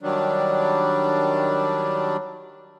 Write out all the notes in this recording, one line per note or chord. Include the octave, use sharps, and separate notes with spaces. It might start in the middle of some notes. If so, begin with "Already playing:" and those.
D#3 F#3 G3 D4